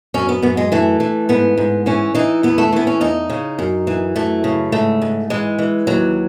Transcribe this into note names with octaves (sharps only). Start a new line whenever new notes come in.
F#2 C#4
B3
F#2 B3
G#3
E3 A3
E3
G#2 B3
G#2
E3 C#4
E3 D#4
E2 B3
A3
E3 B3
C#4
E2 D#4
C#3
F#2
E3
F#2 A3
C#3
G#2 A3
G#2
E3 G#3
E3
D#2 F#3